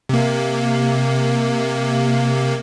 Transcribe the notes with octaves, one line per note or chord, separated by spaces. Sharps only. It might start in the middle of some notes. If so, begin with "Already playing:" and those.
C3 A#3